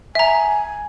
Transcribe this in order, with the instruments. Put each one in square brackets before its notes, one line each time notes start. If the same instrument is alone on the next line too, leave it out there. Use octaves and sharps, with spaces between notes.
[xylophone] E5 A#5 [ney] G#5